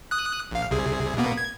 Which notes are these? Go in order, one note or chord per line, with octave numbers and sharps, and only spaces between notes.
D#6 F#6
A#1 F5
C2 C3 G#4
B2 A#3 B3
G#6